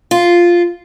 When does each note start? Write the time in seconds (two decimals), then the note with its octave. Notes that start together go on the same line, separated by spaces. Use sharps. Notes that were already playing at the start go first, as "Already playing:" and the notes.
0.11 F4